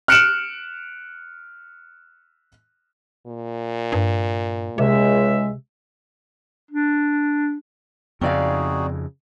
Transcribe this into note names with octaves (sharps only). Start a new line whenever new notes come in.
F6 F#6 C#7 D7 E7 F#7
A#2
G2
C#2 C3 G#3 E5
D4
F2 C#3 C4 D#4 F#4 G#4 D5 F5